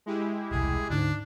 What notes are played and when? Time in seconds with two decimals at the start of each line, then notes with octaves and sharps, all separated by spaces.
0.06 G#3 E4 G4
0.51 E1 C2 G#4
0.90 D2 G#2 D3 D4